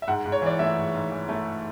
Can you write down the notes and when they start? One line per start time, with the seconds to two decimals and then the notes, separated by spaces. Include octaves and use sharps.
0.02 E5
0.08 G#2 F#5
0.25 G#2
0.32 C#5
0.42 E3 D5
0.59 A3 E5
0.77 G#2
0.94 G#2
1.11 E3
1.29 A3